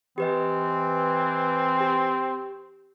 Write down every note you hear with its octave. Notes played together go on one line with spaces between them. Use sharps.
E3 C4 G4 B4 D#5
G4